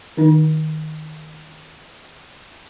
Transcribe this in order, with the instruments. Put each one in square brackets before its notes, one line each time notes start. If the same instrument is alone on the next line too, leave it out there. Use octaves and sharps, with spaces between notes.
[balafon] D#3 D#4